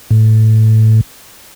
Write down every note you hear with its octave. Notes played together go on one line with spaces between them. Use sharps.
A2